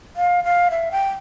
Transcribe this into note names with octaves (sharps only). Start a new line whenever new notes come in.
F5
F5
E5
G5